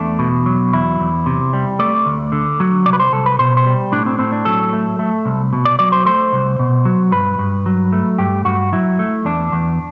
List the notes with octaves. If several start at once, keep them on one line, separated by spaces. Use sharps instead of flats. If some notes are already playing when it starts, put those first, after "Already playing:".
Already playing: E2 A3 D4
B2
F#3
E2 E4
E2
C3
G3
A3 D5
D2
D3
F#3
C2 D5
B4
C5
C2 A4
B4
B2 C5
C5
G3
A2 D4
C4
A2 C4
D4
F#3 A4
A3
A3
C2
B2
D5
F#3 D5
C5
A3 C5
C2
B2
F#3
G2 B4
G2
F#3
A3
G2 G4
G2 F#4
F#3 E4
A3
E2 D4
E2